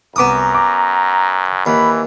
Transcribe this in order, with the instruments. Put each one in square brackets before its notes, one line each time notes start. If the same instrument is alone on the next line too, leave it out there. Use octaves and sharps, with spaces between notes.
[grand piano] C2 D6 D#7 [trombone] F#2 [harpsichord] B3 D#6 [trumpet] A#5
[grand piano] D6
[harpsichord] D#2 [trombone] E3 [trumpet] B5